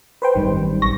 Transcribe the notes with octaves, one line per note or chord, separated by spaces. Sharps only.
B4 C5 G5
G#1 F#2 D#3 G3
A#1 C#6 A#6